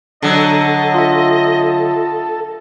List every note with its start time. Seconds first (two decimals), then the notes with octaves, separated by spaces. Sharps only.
0.22 D3 F#3 A4 D#5
0.94 F4 E5